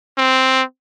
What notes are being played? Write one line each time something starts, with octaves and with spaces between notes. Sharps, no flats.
C4